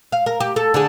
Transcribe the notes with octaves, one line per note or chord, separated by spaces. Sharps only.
F5
A#4
G4
A4
D3 D4 G#4